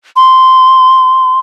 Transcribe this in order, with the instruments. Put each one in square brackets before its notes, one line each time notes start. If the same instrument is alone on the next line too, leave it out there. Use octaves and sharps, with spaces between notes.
[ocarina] C6